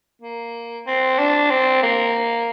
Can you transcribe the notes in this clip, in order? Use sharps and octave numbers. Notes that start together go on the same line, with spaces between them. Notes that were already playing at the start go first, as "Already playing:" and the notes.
A#3
C4
D4
C4
A#3